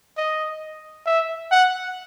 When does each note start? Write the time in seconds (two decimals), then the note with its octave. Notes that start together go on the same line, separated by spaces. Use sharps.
0.17 D#5
1.07 E5
1.52 F#5